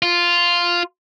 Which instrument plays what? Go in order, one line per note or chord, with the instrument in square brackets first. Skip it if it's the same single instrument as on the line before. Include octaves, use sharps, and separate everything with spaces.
[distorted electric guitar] F4